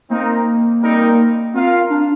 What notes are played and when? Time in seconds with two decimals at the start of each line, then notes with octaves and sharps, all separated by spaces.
0.10 A#3 C4 D#4 A#4
0.82 G3 C4 D#4 A#4
1.54 C4 F4 A#4 F5
1.90 D4